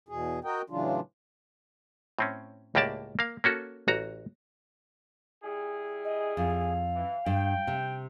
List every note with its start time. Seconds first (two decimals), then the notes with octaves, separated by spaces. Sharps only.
0.09 E2 B2 G#4
0.44 F#4 A#4 D#5 G5
0.70 A2 C#3 E3 F#3 D4 F4
2.19 A2 C4 C#4
2.75 C#2 A2 A#3 G4 D5 A5
3.19 A#3 F5
3.44 A#3 C#4 F#4 A4
3.88 A1 F#4 A#5
5.44 G3 E4 G#4
6.04 D#5
6.37 F2 F5
6.96 E3
7.26 G2 G5
7.67 C3